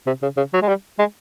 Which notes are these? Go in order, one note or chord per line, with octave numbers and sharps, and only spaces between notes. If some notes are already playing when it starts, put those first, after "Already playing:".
C3
C#3
C#3
F#3
G#3
G3
G#3